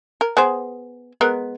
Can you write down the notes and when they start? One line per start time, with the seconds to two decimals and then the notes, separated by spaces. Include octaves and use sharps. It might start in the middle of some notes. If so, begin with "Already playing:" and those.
0.21 A#4
0.37 B3 G#4 C5
1.21 G#3 B3 A#4